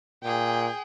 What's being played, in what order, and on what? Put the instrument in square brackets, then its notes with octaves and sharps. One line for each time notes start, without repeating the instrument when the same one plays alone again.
[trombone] A#2 [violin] G#4 G5